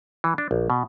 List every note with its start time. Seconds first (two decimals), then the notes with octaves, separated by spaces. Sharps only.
0.24 E3
0.38 D4
0.51 A#1
0.70 B2